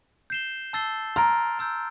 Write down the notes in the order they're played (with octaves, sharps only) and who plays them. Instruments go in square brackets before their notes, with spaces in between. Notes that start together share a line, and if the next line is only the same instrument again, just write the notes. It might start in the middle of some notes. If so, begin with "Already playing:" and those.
[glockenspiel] G6 C7 E7 G7
A5 E6 A6 C7 G7
[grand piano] A#5 [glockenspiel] C6 F6 A6 D7
[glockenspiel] A#5 E6 G6